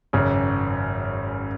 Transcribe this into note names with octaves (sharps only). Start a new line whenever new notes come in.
G#1 F#2 C#3